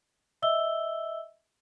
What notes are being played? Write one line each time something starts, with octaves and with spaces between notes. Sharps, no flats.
D#5 E5 E6 G7